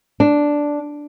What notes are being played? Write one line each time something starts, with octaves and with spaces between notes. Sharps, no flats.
D4